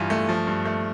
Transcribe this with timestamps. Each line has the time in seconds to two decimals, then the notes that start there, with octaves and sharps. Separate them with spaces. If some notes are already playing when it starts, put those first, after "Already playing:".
Already playing: G2 E3 F4
0.10 A3
0.29 F3
0.47 G2
0.65 A3